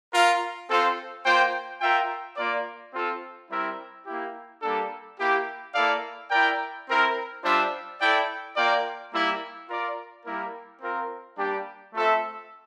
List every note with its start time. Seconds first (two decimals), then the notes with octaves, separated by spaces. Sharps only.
0.13 F4 A#4 F5
0.68 C4 F4 A4 C5
1.25 A#3 F4 C5 G5
1.81 F4 A#4 E5 G5
2.37 A#3 F4 A#4 D5
2.93 C4 F4 A4
3.50 G3 C4 E4 A#4 E5
4.06 A#3 E4 G4
4.63 G3 A#3 D4 A4
5.19 A#3 E4 G4
5.74 A#3 E4 A4 D5 F5
6.31 E4 A#4 D5 G5
6.87 C4 E4 A#4
7.44 G3 D4 F4 C5 E5
8.00 E4 A4 D5 G5
8.56 A#3 F4 A#4 D5 G5
9.13 G3 A#3 E4
9.69 F4 A#4 D5
10.26 G3 A#3 E4 A#4
10.82 C4 F4 A#4
11.37 G3 A#3 D4 G4
11.94 A3 C4 F4 A4 E5